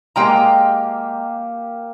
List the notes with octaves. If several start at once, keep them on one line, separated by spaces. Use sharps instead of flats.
G#3 A#3 G4 F5 G5 A#5